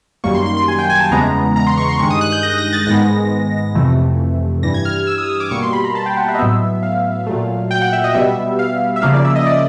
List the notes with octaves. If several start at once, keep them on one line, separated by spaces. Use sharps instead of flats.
F#2 D#3 G3 A#3 C#6
C6
C6
C6
G#5
G5
G#5
A5
E2 C#3 E3 G#3 B3 A#5
A#5
C6
C#6
C6
G2 D#3 G#3 C#6
D#6
F#6
G6
A#6
A#6
A6
G#2 D#3 G#3 B3 A#6
F2 C3 E3 A3
G2 E3 G3 A#6
G#6
F6
F6
E6
D#6
D#6
D6
B2 G3 A#3 C#6
C6
B5
A#5
A5
G5
F#5
E5
D#5
A2 F#3 B3 E5
F5
A#2 F#3 A3
G5
F#5
E5
D#5
B2 G3 B3 E5
F5
E5
C#3 F3 A#3 F5
D5
E5
D#5
D5